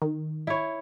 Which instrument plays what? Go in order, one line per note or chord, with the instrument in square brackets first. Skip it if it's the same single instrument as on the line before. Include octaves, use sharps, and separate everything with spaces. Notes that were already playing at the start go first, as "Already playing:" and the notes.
[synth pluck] D#3
[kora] E4 C#5